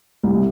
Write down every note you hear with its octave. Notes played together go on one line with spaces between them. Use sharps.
C2